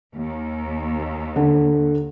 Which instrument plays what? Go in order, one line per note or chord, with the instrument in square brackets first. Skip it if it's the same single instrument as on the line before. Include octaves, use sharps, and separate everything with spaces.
[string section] D#2
[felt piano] D3